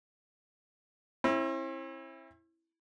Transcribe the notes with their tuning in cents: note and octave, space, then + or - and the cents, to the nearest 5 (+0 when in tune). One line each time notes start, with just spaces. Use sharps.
C4 +45 E4 +0